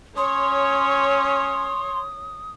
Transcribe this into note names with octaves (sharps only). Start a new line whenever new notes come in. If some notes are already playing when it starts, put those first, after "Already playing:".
C#4 C#5 C6 D#6